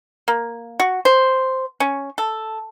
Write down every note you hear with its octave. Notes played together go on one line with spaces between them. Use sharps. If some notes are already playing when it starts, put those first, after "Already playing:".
A#3
F#4
C5
C#4
A4